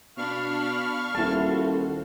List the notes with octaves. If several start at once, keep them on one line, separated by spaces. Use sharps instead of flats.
B2 D4 F5 B5 C#6 F6
D#1 E4 F#4 A4 C5 A5